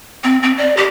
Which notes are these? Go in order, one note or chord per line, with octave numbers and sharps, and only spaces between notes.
C4
C4
D5
G4